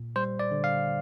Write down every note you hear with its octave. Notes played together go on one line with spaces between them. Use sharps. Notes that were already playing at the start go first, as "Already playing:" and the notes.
Already playing: A#2
G3 C5
D5
D3
F5